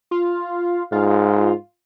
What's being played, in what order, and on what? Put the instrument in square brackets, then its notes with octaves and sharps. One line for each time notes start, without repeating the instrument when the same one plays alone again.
[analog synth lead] F4
[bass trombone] G#2 [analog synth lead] F4